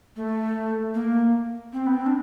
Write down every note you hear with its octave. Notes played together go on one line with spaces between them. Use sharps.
A3
A#3
C4
B3
C4
D4